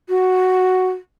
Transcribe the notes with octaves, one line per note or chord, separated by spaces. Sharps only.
F#4